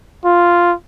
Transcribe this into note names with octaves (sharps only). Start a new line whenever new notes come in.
F4